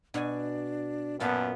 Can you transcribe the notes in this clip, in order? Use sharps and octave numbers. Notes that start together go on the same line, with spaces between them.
B2 D4 F#4 G#5
F#2 A#2 B3 F4 A5